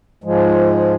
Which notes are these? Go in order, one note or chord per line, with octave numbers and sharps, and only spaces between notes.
G#2 F3 G#3